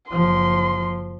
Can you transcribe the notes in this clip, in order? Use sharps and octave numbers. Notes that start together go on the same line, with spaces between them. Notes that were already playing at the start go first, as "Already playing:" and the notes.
F#1 F3 C6